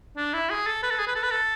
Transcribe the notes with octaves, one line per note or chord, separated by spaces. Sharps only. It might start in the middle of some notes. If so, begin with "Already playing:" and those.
D4
E4
G#4
A4
B4
A4
G#4
B4
A4
B4
A4